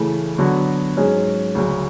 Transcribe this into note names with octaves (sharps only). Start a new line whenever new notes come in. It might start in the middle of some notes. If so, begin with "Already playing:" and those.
Already playing: C#3 E3 A3
D3 F#3 B3 F#4
G#2 F#3 C#4 G#4
D2 C#3 F#3